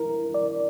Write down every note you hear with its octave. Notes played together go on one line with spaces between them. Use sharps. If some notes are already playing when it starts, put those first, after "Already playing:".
Already playing: E4 A#4
D5